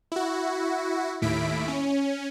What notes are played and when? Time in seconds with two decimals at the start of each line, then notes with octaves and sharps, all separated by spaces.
0.12 E4 F#4
1.22 D#2 A2 E4 B6 D7
1.68 C#4